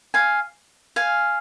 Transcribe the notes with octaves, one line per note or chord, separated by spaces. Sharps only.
F5 G#5
F5 G#5